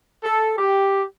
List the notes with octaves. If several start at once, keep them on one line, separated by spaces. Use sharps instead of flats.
A4
G4